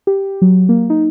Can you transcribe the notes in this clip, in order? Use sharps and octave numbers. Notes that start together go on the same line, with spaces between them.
G4
F#3
A#3
D#4